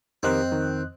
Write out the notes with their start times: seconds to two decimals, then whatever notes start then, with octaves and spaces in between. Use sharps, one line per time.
0.23 F2 D#3 C4 G4 A#4 D#5 F#6
0.52 D#3